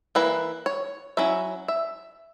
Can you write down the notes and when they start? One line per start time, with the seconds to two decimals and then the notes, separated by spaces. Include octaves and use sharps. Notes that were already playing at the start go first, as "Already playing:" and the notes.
0.15 E3 A#3 E4 B4
0.66 C#5
1.17 F#3 C#4 E4 E5
1.68 E5